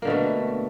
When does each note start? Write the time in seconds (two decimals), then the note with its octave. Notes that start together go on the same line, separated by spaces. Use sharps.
0.02 A#3
0.05 D3
0.07 B2
0.10 A3